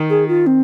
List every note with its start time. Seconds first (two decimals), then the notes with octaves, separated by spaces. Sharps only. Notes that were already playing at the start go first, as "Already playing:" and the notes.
Already playing: D#3
0.10 G#4
0.28 F4
0.47 C4